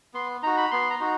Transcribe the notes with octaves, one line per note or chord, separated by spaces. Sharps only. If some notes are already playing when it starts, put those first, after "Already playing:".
B3 C6
D#4 F#4 A#5
B5
B3 C6
A#5
D#4 F#4